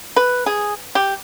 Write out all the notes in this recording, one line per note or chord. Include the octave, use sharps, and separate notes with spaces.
B4
G#4
G4